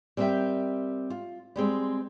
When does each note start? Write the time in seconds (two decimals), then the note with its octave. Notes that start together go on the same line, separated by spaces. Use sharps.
0.17 G3 C4 A#4 B4 E5 G5
1.10 F4
1.56 G3 G#3 C4